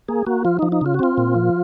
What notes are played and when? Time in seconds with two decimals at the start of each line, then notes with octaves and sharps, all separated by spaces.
0.08 A#3 G#4
0.27 A#3 F#4
0.45 F3 F4
0.59 F3 D#4
0.72 D#4
0.81 C#3 F4
0.94 F#4
0.99 C4 F4
1.18 A#2
1.36 F3